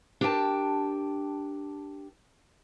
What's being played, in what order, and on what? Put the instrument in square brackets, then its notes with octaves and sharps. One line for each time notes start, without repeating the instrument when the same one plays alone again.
[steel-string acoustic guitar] D4 G4 A#4 C#5 G5 A5